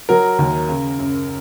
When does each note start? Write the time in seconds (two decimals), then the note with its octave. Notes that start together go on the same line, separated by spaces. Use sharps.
0.09 F#3 A#4
0.39 D#2
0.69 C#3
0.99 F#2